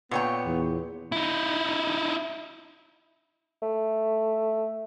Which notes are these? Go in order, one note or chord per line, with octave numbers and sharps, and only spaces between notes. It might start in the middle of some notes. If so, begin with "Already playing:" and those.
A#2 B3 C#5 G5
E2
D#4 E4
A3